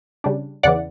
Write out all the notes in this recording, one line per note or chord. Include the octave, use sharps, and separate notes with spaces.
C#3 G3 D4
E2 C#3 E3 D5 F#5